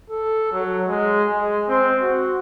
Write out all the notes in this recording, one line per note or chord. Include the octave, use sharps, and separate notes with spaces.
A4
F#3
G#3
G#3
C4
F#4